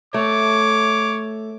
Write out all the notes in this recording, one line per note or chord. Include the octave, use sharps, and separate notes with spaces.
A3 C#5 D6